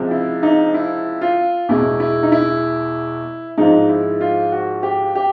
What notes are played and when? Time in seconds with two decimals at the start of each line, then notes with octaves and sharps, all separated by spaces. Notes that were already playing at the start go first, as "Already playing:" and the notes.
Already playing: C#2 C3 F3 G#3
0.11 E4
0.43 D#4
0.74 E4
1.21 F4
1.69 E2 B2 G#3 E4
2.00 E4
2.23 D#4
2.32 E4
3.57 G#2 F3 G#3 D#4
3.89 E4
4.21 F4
4.52 F#4
4.83 G4
5.15 G4